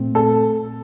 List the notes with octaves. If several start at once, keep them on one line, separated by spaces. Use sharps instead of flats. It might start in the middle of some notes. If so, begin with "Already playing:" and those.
Already playing: A#2 A3 C4
A4